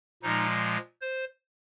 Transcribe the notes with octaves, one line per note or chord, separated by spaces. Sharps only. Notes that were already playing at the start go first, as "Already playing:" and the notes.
A#2 F3 G#3 D#4
C5